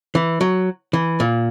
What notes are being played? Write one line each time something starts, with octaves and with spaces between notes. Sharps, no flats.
E3
F#3
E3
A#2